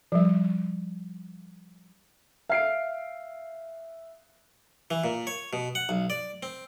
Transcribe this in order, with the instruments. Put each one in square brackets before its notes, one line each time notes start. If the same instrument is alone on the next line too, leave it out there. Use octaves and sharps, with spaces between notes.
[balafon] F3 G3
[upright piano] E5 C7 D7 [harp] F5
[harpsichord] E3
A#2
C#5
B2
F#5
B1
D5
C4